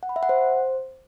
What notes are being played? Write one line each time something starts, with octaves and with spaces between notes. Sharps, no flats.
F#5
B5
E5
F#5
C5